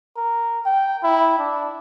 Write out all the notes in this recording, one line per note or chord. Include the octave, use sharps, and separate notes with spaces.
A#4
G5
E4
D4